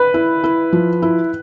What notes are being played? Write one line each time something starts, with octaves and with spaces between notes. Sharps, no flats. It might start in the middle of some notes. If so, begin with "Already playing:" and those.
Already playing: B4
E4
E4
F3
E4